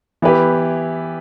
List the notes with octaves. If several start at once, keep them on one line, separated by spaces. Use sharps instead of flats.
E3 B3 E4 G4 B4